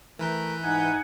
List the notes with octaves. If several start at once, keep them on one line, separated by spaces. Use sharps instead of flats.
E3 A3 A#4 B4 G6
G#2 D#4 F#5 G#5